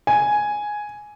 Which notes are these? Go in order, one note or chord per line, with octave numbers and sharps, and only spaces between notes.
G#5